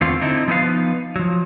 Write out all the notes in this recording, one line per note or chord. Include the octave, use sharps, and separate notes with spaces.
E2 D3 A3 C4 F4
D3 C4 D#4 E4
F3 B3 D#4 E4 B4 F5
F3 F#3